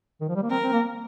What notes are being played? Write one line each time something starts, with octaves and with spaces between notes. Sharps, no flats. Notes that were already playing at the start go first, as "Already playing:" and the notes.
D#3
F3
G3
A#3
C4 A#4
C4
A#3